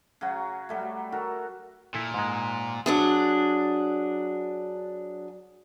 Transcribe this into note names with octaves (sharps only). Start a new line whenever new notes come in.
C#3 F#3 F#4
F#3 G3 A3
F#4 A4 A#4
A#2 E4 A4
G#2 G#3
F#3 D4 G#4